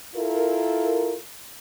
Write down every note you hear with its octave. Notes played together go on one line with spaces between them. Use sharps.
E4 F4 A4 A#4